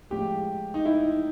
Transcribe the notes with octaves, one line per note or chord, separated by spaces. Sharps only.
A2 F3 G#3 G4
D#4
E4